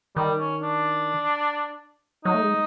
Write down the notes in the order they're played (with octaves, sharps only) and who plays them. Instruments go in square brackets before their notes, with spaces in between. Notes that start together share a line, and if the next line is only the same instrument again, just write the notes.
[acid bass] D#3 [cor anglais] G3
[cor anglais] C#4
D4
[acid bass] F#3 [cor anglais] D#4
[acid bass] A3
G#3